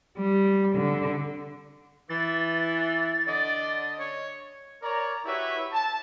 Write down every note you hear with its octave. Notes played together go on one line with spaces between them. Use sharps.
G3
D3
E3 A6
D3 D5 D#5
C#5
A#4 C#5 D5 A#5
E4 F#4 G4 B4 C#5 E5
A5